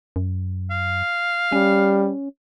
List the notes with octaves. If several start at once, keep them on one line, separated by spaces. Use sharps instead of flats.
F#2
F5
G3 C#4